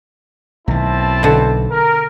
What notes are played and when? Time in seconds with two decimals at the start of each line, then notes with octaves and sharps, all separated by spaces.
0.68 B1 D#3 C4 E4 A5
1.23 B2 D3
1.71 A#4